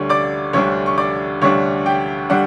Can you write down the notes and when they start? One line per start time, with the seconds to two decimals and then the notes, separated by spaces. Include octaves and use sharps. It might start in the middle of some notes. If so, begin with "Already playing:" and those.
Already playing: D2 D3 G3 D4 C#5 C#6
0.09 D5 D6
0.53 D2 D3 G3 D4 C#5 C#6
0.86 C#6
0.98 D5 D6
1.41 D2 D3 G3 D4 C#5 C#6
1.86 G4 G5
2.30 D3 G3 D4 F#5